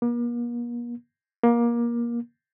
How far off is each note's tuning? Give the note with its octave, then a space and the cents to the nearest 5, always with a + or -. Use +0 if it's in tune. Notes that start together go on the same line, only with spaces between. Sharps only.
A#3 +45
A#3 +25